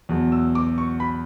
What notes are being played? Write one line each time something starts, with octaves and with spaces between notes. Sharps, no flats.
E2 B2 F#3
E6
D6
C#6
B5